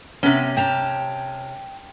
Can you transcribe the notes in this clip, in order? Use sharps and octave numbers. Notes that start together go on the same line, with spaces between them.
C3 B3 C#4
G5 A5 A#5